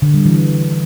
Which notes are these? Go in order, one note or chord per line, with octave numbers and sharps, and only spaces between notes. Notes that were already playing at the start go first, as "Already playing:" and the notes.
D3
G3
E3